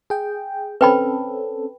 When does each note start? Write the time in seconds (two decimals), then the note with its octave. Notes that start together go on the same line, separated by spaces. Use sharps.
0.10 G#4 G5
0.81 C4 C#4 A4 B4 G5 B5